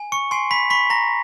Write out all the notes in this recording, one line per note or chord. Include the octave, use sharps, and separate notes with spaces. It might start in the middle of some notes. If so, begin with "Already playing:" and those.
Already playing: G#5
C#6 C#7
G#5 C6 C7
B5 B6
B5 C#6 B6
A#5 A#6